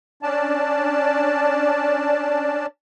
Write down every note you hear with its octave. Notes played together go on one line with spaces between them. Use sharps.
C#4 D4 D5 A5